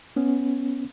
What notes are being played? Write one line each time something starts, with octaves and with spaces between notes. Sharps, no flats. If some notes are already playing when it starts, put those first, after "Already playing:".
B3 C#4